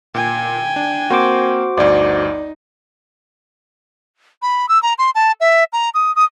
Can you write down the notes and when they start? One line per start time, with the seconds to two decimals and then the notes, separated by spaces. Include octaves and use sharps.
0.15 A#2 G5 G#5
0.76 D4
1.10 A#3 C4 F#4 C5 D6
1.77 G1 D2 D#4 D5
4.42 B5
4.69 E6
4.83 A#5
4.98 C6
5.15 A5
5.40 E5
5.73 A#5
5.94 D#6
6.16 D#6